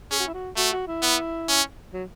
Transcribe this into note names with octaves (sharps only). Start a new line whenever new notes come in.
C#4 G#4
F#4
E4
F#4
A3 F#4
F#4
E4
B3
C#4
F#3